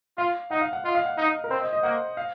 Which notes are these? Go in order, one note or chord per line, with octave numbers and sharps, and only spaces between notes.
F4 F5
D#4 F#5
F5
F#5
F4 D#5
F5
F#5
D#4 D#5
A#4
C4 C5
D#5
D#5
A#3 F#5
F5